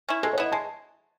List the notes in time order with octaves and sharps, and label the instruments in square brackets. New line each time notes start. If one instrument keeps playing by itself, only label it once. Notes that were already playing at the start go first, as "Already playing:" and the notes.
[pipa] C#4 E4
[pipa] G#3 [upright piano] A4
[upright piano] C#5
[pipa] B3 E4 [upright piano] D#5
[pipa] G#3 [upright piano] A5